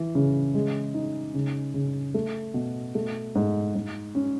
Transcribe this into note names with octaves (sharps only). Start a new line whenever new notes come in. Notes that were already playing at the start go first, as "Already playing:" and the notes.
Already playing: E3
C#3
G#3
D#4
C#3
C#3
A3
B2
A3
G#2
G#2
C#4